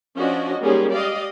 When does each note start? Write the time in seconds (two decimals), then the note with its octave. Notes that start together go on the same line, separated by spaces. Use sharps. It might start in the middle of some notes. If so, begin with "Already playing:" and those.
0.17 F3 C#4 D4 F#4 D#5
0.61 G3 G#3 A#3 C#4 D#4 G#4
0.91 G4 D5 D#5 F5